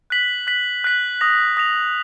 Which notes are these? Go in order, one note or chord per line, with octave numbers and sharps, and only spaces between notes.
F#6 B6 F#7
F#6 B6 F#7
F#6 B6 F#7
D#6 A#6 F7
D#6 A#6 F7